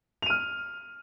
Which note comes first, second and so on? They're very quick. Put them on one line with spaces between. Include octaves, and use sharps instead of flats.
F7 D#7 F6